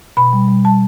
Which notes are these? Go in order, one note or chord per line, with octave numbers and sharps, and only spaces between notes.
B2 B5
G3
G3
G3 A5